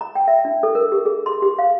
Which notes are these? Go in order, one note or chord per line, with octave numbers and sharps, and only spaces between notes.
A#5
G5
E5
D4
A4
A#4
G4
G#4
C6
G4
F5